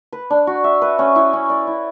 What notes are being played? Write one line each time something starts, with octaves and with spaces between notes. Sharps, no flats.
B4
D4
F#4
E5
B4
C#4
E4
C#4
D5
E4